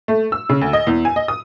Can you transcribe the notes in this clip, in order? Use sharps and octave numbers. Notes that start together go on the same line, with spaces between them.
A3
E6
C#3
D2
D#5
E2
G#5
D#5
D#6